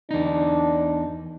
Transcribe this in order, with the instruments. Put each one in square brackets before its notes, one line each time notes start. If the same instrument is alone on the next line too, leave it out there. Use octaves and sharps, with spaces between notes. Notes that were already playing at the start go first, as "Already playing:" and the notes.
[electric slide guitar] E2 D#4 [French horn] D4